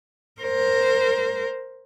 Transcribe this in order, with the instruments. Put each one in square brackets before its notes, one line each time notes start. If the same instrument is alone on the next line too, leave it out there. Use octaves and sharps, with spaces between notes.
[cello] A#4 C5